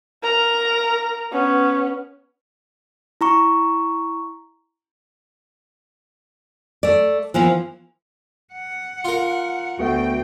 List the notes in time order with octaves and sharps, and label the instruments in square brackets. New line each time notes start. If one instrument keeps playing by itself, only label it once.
[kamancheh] A#4 A#5
B3 C#4
[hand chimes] E4 A#5 C#6
[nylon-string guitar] A3 D5
E3 F3 A#3 B3
[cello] F#5
[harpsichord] F4 A#4
[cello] D2 G5 [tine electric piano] A3 B3 F#4